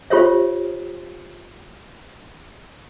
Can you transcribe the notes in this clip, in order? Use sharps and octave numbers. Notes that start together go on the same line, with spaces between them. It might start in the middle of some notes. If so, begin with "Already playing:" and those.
F4 G4 C5 C#5 E5